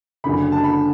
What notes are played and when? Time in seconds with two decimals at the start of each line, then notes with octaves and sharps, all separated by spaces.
0.24 F#1 F#2 D3 B5
0.52 A5
0.64 B5